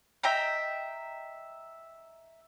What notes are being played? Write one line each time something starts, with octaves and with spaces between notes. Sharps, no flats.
D#5 E5 G5 A#5